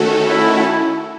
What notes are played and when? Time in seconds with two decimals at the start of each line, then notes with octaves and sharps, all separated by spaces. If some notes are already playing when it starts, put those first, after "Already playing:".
Already playing: D#3 A3 C#4 F#4 A4
0.27 E4